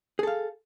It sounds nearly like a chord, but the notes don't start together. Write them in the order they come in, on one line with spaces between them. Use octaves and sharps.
G#4 A4 F5